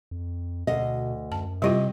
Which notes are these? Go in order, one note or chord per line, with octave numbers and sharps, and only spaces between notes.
F2
D2 B2 D#5
F#2 A5
C3 G3 E4 F4 D#5